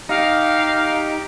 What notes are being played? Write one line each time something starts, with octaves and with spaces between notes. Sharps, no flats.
D#4 G4 F5